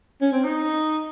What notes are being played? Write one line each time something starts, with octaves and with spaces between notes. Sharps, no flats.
C#4
C4
D#4